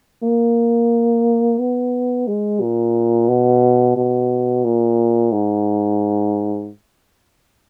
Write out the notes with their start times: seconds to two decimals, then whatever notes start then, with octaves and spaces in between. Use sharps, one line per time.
0.23 A#3
1.59 B3
2.27 G#3
2.61 A#2
3.28 B2
3.96 B2
4.64 A#2
5.32 G#2